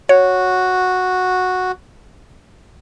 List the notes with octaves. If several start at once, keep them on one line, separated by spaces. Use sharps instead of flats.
F#4 C#5